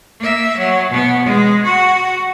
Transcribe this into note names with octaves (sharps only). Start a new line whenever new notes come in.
A#3 E5
F#3
B2 B3
G#3
F#4